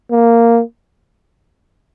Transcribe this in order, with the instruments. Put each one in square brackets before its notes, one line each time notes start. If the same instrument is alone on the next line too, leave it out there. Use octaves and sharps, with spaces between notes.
[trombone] A#3